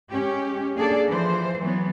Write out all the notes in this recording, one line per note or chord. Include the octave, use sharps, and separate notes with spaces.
G#3 C#4 G4
A#3 D4 G#4 A4 D5
E3 F3 C5
E3 F#3 B3